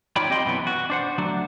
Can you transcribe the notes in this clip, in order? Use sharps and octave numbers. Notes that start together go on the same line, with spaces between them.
D#4 F4 C#5 D5 G5 B5
C4 G4 D#5 G5 B5 C6
F#2 B2 E3 B3
F#4
D4 C5 F#5
D2 F#3 D4